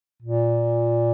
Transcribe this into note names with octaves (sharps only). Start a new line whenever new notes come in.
A#2